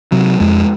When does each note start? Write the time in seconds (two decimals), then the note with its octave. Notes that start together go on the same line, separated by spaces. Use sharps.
0.12 C3 F#3
0.40 F2 G#3